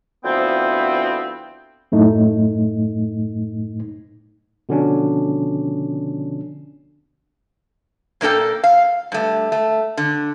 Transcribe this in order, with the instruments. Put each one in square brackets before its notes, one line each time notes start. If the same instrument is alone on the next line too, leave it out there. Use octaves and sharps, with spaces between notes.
[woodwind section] D2 F3 B3 C4 E4 G5
[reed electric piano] F#2 A2 A3 D#4
[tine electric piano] B2 D3 F3 C#4 D4
[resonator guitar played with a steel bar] A#2 A#3 D4 A4 G5
F5
G2 A3
A3
D3